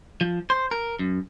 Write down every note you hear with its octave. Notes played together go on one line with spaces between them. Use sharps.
F3
C5
A#4
F#2